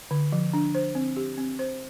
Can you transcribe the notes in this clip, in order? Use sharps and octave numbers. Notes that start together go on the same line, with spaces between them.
D3
F3
D4
C5
C4
G4
C4
C5